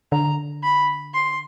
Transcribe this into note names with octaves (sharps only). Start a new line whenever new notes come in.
D3 A#5
B5
C6